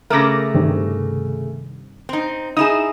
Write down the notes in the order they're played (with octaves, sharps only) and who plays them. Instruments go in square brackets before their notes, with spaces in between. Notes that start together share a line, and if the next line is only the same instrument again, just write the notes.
[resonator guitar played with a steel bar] C#3 A3 [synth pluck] A#4 D6 A#6
[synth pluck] G2 C3 D#3
[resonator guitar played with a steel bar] C4 D#4
[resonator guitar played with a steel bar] D#4 E4 G#4 [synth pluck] D#6 E7